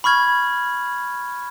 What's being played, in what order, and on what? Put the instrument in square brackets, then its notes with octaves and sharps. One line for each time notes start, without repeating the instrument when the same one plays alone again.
[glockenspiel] B5 C#6 F6 G#6